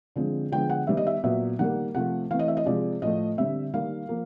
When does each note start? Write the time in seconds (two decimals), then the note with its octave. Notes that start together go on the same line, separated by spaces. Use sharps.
0.16 D3 F3 G#3 C4
0.52 D3 F3 G#3 B3 G5
0.70 F#5
0.87 D#3 G3 B3 E5
0.97 D#5
1.07 E5
1.24 A#2 F#3 B3 E5
1.59 D#3 G3 A#3 F#5
1.95 C3 F3 A3 F#5
2.31 E3 A3 C4 F5
2.39 D#5
2.48 E5
2.57 D#5
2.66 C3 F3 G#3 D5
3.02 A2 F3 A3 D#5
3.37 D3 G3 C4 E5
3.74 D#3 G3 A#3 F5
4.09 F3 A#3